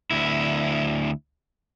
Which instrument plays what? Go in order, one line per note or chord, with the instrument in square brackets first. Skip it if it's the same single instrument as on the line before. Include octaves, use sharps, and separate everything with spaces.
[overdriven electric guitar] D2 E4